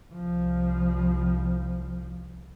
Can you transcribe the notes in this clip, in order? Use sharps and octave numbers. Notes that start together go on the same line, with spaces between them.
C2 F3